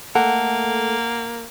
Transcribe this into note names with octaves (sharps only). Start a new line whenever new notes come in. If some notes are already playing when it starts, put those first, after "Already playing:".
A3 A#3 A4 F#5